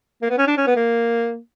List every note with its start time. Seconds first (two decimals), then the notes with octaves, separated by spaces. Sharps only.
0.22 A#3
0.30 B3
0.38 C#4
0.47 D4
0.57 C#4
0.67 B3
0.76 A#3